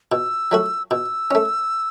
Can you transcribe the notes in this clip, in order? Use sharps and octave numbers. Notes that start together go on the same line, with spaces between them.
B2 E6
F#3 A3 F#4
B2 E6
A3 C#4